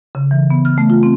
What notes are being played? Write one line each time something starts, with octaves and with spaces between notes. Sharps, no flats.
C#3
E3
B3
F6
A3
F4
C4